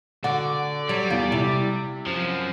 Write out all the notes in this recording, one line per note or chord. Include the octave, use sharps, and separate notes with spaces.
D3 F#4 D5 F#5
F#3 G3
E2 F4
C3 E4
F#2 F3